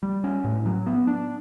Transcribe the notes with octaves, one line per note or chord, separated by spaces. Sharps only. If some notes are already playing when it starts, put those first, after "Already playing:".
G3
C#4
A2
F#3
B3
D4